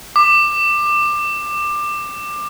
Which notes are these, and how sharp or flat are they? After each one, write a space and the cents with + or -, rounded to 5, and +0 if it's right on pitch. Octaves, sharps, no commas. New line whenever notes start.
D6 +20